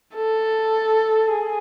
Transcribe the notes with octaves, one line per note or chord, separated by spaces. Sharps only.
A4
G#4